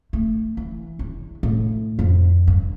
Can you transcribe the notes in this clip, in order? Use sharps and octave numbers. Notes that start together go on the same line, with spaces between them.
A3
E3
E2
A2
F2
G2